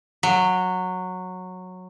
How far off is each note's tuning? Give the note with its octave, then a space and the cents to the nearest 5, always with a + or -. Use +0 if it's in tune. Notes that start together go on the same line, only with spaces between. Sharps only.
F#3 -10